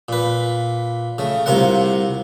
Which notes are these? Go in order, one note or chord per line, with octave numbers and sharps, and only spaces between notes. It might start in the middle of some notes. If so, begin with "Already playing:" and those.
A#2 B4
C#3 A3
C2 C3 F4 A#4 F#5